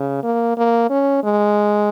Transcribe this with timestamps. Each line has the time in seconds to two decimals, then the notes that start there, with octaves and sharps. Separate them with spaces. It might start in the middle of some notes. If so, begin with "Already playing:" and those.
Already playing: C#3
0.23 A#3
0.57 A#3
0.90 C#4
1.24 G#3